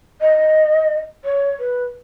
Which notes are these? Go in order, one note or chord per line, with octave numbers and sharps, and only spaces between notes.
D#5
C#5
B4